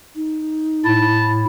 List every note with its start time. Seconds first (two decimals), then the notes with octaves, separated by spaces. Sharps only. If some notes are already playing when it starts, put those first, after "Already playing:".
0.16 D#4
0.85 A2 E4 A5